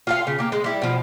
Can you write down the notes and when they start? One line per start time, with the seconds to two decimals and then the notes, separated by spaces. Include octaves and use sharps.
0.07 F4 A4 F5
0.27 C#3
0.38 A#3 G4
0.52 G#3
0.64 G3 E4
0.82 B2 F3